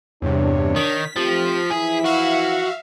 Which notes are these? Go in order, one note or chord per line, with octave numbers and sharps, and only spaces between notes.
E2 G2 C3 D4 C#5
D#3 B6
F3 A3 C4 G4
E3 F3 E4 G#4
F#4 E5 F5